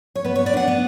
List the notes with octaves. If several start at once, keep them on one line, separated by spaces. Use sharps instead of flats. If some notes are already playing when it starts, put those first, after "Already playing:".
C#5
B3 B4
B3 C#5
D5
D4 F#5
B3